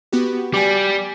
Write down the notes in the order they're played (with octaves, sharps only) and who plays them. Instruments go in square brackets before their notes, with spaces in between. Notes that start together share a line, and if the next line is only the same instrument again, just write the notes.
[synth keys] B3 F#4 G4
[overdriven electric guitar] G3 [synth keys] G#5 D6